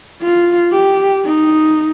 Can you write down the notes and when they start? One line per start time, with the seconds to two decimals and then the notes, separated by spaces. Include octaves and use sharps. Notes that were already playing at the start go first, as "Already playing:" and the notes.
0.22 F4
0.72 G4
1.25 D#4